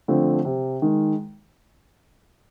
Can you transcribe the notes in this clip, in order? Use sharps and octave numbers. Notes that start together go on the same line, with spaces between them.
D3 F3 A3 C4
C3
D#3 G#3